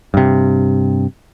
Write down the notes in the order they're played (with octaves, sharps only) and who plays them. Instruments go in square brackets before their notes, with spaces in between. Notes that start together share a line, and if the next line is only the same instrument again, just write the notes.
[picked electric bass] G2 C3